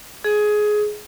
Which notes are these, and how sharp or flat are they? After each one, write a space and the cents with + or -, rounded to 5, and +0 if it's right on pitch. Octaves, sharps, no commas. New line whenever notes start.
G#4 +15